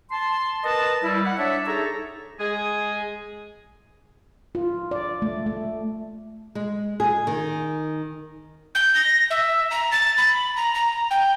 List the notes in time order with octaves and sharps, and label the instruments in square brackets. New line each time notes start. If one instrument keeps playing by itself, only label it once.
[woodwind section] A5 C6
A#4 B4 D#5 A5
G3 E4
F#5
D4 C#5 D5 E5
D#4 G#4 A4 C#5 E5 A#5
[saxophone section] G#3 G#4
[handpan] F4
D5
A3
A3
[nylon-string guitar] G#3
G#4
D#3
[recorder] G6
A#6
E5
A#5
A6
B5
A#5
A#5
G5